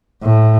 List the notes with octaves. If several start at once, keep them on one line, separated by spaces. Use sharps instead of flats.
A2